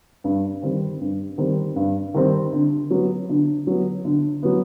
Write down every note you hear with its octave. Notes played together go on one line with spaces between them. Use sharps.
G2
D#3 G3 C4
G2
D#3 G3 C4
G2
D#3 G3 C4
D3
F#3 B3
D3
F#3 B3
D3
F#3 B3